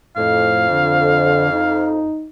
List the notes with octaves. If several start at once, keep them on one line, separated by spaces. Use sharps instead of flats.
F2 A2 F5
D3
D#4